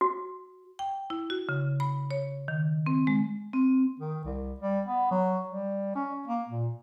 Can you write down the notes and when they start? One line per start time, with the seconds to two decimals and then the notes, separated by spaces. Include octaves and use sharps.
0.01 F#4
0.79 G5
1.10 E4
1.30 F#4
1.49 C#3
1.80 B5
2.11 C#5
2.48 D#3
2.86 C4
3.07 G#3
3.53 C4
4.00 D#3
4.25 C2
4.60 G3
4.86 B3
5.11 F#3
5.48 G3
5.95 C#4
6.27 A#3
6.49 A#2